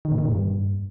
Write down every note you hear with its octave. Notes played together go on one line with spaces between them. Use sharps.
D#3
A#2
D#3
A#2
G2